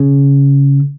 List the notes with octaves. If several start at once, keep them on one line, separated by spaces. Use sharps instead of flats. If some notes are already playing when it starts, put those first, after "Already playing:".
Already playing: C#3